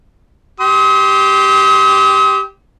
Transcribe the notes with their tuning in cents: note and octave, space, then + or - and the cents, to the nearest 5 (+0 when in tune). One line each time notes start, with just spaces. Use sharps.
G4 -5 C6 +0 D#6 +40